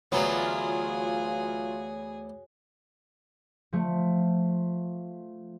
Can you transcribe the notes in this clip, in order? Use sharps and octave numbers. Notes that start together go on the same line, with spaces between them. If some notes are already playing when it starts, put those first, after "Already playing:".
D2 E3 F#3 B3 F4 G#4
F3 A3